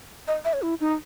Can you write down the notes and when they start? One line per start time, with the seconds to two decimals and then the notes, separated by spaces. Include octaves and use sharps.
0.28 D#5
0.45 E5
0.53 C#5
0.62 E4
0.80 D#4